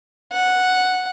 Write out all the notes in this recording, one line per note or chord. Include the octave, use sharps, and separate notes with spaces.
F#5